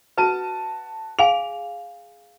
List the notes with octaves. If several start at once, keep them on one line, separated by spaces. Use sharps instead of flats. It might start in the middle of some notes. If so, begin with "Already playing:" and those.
F#4 B4 A5 D#7
G#4 F5 G#5 F7